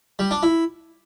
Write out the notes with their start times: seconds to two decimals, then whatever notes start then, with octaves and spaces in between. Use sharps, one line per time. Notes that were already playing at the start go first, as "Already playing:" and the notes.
0.19 G3
0.31 D4
0.43 E4